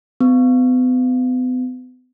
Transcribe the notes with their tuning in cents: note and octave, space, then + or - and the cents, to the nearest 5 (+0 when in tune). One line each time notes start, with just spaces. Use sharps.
B3 +40